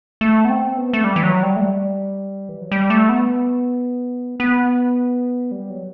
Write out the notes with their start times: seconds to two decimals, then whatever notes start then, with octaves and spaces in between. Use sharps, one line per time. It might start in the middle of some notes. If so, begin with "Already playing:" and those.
0.21 A3
0.45 B3
0.50 C4
0.77 B3
0.93 A3
1.04 G3
1.16 E3
1.23 F#3
1.43 G3
1.56 A3
1.61 G3
2.49 E3
2.61 F#3
2.72 G3
2.90 A3
3.09 B3
4.40 B3
5.51 G3
5.70 F#3